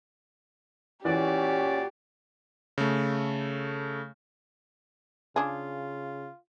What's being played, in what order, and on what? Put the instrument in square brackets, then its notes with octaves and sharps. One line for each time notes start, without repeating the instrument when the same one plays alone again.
[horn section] A#2 F#4 D5 [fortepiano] E3 [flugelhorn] C#4 [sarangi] G4
[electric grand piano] C#3 A3
[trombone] C#3 [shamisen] D4 G#4 [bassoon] F4